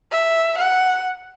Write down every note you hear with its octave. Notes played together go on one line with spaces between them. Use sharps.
E5
F#5